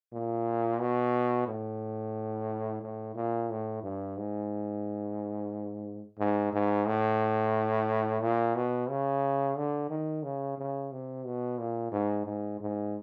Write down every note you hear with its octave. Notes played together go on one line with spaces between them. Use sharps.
A#2
B2
A2
A2
A#2
A2
G2
G#2
G#2
G#2
A2
A#2
B2
C#3
D3
D#3
C#3
C#3
C3
B2
A#2
G#2
G#2
G#2